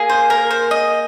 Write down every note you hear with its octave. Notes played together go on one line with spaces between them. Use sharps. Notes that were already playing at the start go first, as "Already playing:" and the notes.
Already playing: A#3 G#4
C5
A#4
C5
D#5